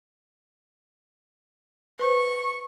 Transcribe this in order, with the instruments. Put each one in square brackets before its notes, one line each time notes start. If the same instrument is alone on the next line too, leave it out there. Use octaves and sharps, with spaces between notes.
[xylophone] B4 C5 [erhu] C#6